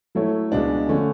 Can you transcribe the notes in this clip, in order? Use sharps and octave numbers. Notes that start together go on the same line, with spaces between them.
F#3 A3 E4 A4 C#5
C#2 B2 G#3 D4
D3 A3 C#4